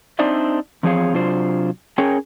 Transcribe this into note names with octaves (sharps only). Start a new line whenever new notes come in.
C4 D4 D#4 C5 D5 E5
E2 F3 C4 G#4 C#5 F5
C3 F#3 D4 F4 C5
C#4 G#4 A#4 C#5 G5